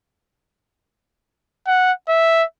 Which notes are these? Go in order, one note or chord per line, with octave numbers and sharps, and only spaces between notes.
F#5
E5